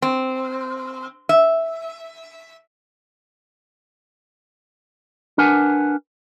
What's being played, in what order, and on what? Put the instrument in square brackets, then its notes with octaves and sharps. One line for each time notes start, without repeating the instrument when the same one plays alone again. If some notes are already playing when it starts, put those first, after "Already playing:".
[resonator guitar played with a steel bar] C4
E5
[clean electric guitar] D4 A#4 B4 F#5 G#5